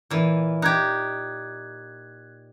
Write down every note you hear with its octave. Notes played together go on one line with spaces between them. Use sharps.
A#2 E3
D#4 G4 F#6 G#6